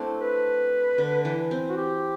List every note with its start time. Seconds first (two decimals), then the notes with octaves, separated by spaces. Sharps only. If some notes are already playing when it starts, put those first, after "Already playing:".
Already playing: A3 C4 D4 E4
0.21 B4
0.98 D3
1.25 E3
1.51 C4
1.69 F#4
1.76 G4